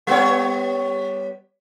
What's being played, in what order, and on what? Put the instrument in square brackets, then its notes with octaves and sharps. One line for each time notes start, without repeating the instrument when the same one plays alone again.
[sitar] G3 B3 C#5